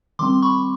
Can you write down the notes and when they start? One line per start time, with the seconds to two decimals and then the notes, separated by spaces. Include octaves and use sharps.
0.19 D#3 G3 C4 C6 D6
0.42 B5 C#6